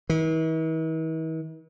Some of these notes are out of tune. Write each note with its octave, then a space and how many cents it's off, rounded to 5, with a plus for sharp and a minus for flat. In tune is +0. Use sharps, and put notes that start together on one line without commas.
E3 -45